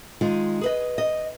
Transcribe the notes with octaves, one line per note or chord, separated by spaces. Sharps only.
D#3 G#3 F4 G#4
G#4 B4 D#5
D#5